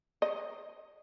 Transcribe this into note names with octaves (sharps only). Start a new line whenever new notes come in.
D#5